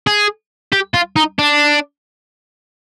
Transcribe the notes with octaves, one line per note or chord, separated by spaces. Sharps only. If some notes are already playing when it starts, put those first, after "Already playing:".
G#4
G4
F4
D#4
D4